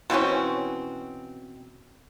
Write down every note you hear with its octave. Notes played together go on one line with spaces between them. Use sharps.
B2 E3 C4 C#4